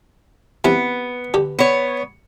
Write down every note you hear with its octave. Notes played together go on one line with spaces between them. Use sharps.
C3 E3 B3
D3 G4
B3 C#5